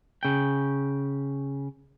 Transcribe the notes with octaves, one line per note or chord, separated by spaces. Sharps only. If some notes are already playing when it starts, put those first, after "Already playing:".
C#3 G5